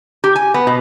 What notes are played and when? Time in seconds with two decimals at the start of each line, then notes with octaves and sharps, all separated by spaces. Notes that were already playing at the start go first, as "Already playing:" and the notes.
0.24 G4
0.36 G#5
0.54 B3
0.67 B2